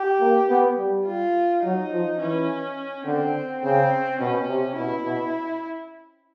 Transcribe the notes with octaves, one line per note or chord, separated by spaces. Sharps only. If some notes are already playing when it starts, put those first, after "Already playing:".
Already playing: G4
A#3
B3
G3
F4
F#3 D#4
F3
E3 C#4
D3 C4
C#3 C4
B2 C#4
C3
B2 E4
B2